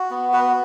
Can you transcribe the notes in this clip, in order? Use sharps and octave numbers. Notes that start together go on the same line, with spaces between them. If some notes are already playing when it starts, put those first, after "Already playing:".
Already playing: F#4
B3
F#4 B4